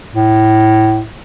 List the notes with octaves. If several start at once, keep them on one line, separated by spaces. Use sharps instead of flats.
A2